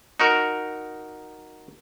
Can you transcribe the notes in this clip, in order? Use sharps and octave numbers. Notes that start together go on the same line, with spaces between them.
D#4 F#4 A#4